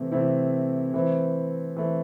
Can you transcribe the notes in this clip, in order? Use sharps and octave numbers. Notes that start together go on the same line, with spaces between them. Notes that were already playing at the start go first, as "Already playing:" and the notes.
Already playing: C3 E3 A3 C4
C3 E3 A3 C4 E4
E3 A3 C4
E3 A3 C4